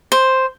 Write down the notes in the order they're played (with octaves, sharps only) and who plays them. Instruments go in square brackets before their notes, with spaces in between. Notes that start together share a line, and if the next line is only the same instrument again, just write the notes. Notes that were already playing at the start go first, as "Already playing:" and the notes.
[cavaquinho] C5